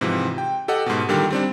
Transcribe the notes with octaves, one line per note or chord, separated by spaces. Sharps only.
G#2 C3 E3 F3
G5
G4 A4 D#5 F#5
G#2 B2
A#2 D3 D#3 G3 G4
G3 C4 D4